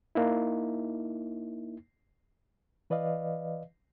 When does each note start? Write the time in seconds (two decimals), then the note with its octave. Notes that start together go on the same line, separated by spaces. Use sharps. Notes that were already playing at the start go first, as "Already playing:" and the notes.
0.15 A#3 D#4 E4
2.90 E3 B4 D5 D#5 F5